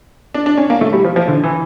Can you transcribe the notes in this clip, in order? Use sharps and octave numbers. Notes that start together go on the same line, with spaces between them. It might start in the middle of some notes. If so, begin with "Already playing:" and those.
D4
D4
C#4
A#3
A3
G3
F3
F3
D3
E3